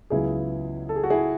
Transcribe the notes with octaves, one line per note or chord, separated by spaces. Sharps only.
C#2 C#3 F#3 B3 E4 G#4
A4
G#4
F#4
E4 G#4